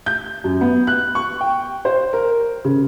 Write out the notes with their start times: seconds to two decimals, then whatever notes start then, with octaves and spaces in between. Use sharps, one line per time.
0.06 G6
0.44 F#2
0.61 B3
0.87 F#6
1.15 C#6
1.41 G5
1.85 C5
2.13 A#4
2.65 C#3